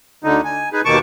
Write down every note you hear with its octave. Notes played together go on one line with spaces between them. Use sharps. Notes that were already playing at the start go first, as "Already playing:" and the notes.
D2 D3 D#4
G#5
D#4 G#4 B4
D#2 B2 D#3 A5 C#6 D6